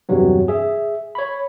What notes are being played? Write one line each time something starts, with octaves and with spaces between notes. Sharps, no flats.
E2 G2 C3 F#3 B3
G#4 E5
C#5 B5